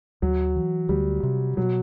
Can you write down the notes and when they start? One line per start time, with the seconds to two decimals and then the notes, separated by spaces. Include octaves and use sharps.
0.22 D2 F#3
0.56 E3
0.89 D2 G3
1.23 C3
1.57 B2 F#3